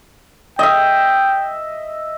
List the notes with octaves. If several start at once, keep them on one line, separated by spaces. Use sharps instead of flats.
D#5 E5 G5